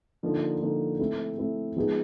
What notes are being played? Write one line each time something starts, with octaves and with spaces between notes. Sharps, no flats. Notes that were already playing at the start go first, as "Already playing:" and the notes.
D3 F3 A#3 D#4
D3 F3 A#3 D#4
A3 C4 E4
A3 C4 E4
F3 G#3 B3 D#4 G#4